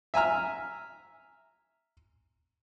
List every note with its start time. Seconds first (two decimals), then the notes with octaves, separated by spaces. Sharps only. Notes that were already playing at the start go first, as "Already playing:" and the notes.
0.14 E5 G#5 A#5 F6